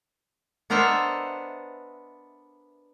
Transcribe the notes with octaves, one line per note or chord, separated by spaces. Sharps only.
B3 D4 A#4 C5 D#5 E5